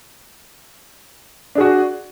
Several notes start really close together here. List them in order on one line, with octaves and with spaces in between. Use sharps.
D4 G#4 F#4